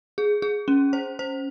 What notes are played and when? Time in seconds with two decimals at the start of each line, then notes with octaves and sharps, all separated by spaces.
0.18 G#4
0.42 G#4
0.68 C#4
0.93 C5
1.19 C5